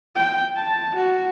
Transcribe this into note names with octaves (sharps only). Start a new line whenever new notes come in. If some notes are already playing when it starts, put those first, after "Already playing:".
G5
A5
F#4